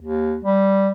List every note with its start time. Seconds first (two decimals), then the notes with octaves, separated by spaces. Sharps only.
0.01 D#2
0.45 G3